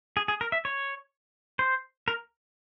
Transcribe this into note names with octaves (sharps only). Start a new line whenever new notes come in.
G#4
G#4
A#4
E5
C#5
C5
A#4